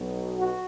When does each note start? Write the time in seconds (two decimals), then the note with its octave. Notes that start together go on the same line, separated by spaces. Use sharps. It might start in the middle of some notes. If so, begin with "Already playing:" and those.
Already playing: B1 B2 F#3
0.37 F#4